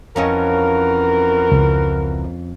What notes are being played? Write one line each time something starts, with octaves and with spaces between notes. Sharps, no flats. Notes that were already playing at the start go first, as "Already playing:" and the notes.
F2 E3 C#4 F#4 A#4 D#5
C#2